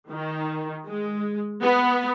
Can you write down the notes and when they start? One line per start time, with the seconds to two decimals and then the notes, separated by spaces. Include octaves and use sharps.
0.11 D#3
0.87 G#3
1.62 B3